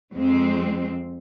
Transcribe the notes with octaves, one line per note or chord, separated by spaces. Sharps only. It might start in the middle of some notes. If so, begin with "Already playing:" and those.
F2 G#3 C4